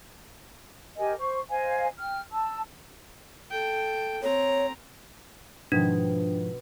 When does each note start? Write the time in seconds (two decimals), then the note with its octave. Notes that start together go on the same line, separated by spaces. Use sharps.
0.98 G4 A#4 D#5 G#5
1.19 C5 C#6
1.50 C5 D#5 F5 G#5
1.99 G5 F6
2.32 A5 E6
3.51 A4 G5
4.23 C4 C#5 A#5
5.72 G#2 B2 D#3 F3 D4